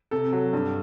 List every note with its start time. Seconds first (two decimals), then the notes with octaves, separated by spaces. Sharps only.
0.11 C3 A4
0.33 F#3
0.53 G2